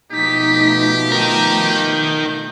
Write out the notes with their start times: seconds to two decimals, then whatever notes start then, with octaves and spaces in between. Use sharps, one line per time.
0.12 B2 F3 A3 D#4 G4 B6
1.12 D#4 A#4 G6